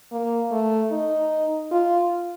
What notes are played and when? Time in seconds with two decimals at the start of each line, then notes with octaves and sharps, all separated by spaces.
0.12 A#3
0.51 A3
0.91 D#4
1.71 F4